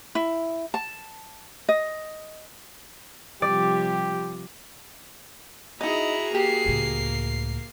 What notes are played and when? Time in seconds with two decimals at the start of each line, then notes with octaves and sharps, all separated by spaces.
0.15 E4
0.74 A5
1.69 D#5
3.42 C3 F3 G3 G4 D5
5.81 D#4 E4 F#4 G#4 D#5 A#5
6.34 A#3 G4 C7
6.65 C#2 A2